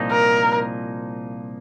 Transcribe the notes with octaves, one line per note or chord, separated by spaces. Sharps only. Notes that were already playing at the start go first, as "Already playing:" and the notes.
Already playing: C2 A#2 F3 A#3 D#4
A#4